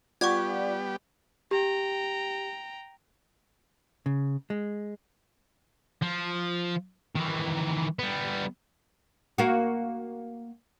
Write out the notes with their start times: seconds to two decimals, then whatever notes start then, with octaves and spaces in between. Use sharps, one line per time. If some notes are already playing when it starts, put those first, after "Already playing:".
0.21 G3 B3 F4 G4 D5 F#5 C#6 G#6
1.51 G4 G5 A#5
4.06 C#3
4.50 G#3
6.02 F3
7.16 D#3 E3
7.99 G3 B3
9.38 A#3 F#4